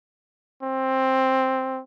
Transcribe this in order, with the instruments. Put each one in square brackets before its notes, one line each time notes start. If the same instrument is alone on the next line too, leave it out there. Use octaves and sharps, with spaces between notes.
[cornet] C4